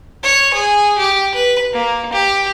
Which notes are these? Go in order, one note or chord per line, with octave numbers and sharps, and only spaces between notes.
C#5
G#4
G4
B4
A#3
G4